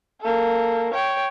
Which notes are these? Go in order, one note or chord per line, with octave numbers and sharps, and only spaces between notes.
A#3 A4
C#5 G5